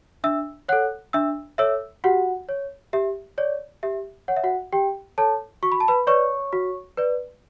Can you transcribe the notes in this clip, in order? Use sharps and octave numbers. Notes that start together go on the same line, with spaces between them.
D4 E5 E6
A4 C#5 F#5 F#6
D4 E5 E6
A4 C#5 E5 E6
F#4 G4 F#5
C#5
G4 E5
C#5 D5
G4 E5
C#5 F#5
E5
F#4 F#5
G4 G5
A4 C#5 A5
F#4 C#6
B5
A5
B4 B5
B4 C#5 D5 C#6
F#4
B4 D5